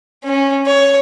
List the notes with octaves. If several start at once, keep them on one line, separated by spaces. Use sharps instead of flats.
C#4
C#5